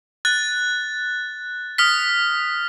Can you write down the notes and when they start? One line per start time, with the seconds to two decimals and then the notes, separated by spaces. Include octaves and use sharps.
0.25 F#6 A6
1.78 D#6 F6 B6